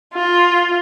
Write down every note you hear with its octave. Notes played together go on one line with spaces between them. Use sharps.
F4